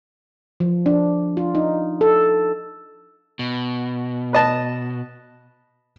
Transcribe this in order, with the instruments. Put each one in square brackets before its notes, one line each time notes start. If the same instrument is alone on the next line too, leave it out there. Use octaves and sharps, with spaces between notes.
[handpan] F3
D4
F4
D#4
A4
[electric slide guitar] B2
[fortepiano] B4 D#5 A5